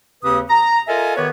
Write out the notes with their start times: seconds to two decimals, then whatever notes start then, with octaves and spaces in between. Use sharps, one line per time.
0.24 D#2 C#3 C4 G4 B4 D#6
0.50 A#5
0.88 F4 A4 A#4 D#5 E5 G#5
1.17 D#3 B3 G4 B4 C#5